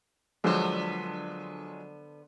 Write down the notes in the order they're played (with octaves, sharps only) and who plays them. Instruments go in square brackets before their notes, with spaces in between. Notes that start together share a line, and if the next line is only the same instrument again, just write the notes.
[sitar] D3 B3 C5 [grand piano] F3 F#3 G#3